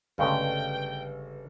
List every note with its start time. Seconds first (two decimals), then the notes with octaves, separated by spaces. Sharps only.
0.18 G1 G2 C#3 G#3 A3 C#4 B4 G5